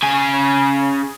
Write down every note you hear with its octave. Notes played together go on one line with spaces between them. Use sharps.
C#3 G#5